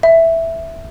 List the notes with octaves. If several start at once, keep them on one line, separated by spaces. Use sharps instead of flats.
E5